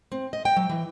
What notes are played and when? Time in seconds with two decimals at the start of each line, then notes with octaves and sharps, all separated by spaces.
0.12 C4
0.33 D#5
0.45 G5
0.56 F#3
0.69 E3